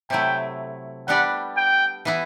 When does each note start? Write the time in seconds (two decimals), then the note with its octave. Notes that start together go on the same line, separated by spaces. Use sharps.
0.10 C3 F#3 A3 E4 G5
1.08 G3 B3 D4 G4 D5 F#5
1.57 G5
2.05 E3 B3 E4